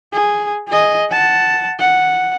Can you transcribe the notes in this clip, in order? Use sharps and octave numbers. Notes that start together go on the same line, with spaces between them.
G#4
G#4 D#5
F#5 A5
F#5